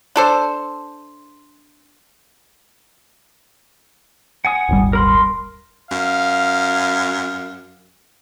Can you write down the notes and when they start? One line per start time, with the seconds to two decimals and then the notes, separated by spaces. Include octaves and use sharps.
0.16 D4 A4 C5
4.45 F#5 G#5 D#6
4.69 D#1 G#1 G3
4.93 A#4 B5 C6
5.91 F#2 F5